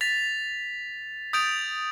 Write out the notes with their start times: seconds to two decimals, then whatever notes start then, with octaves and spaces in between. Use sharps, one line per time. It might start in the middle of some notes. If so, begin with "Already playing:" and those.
0.01 A6 B6 F7
1.33 D#6 G6 A6 D7 F7